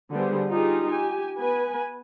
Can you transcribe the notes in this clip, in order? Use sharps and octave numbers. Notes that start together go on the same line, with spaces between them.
D3 G3 B3 D4 G#4 C5
D#4 F4 G4 G#4
G4 G#5
B3 B4 G#5